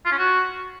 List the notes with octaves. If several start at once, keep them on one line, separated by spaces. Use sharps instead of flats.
F4
C#4
F#4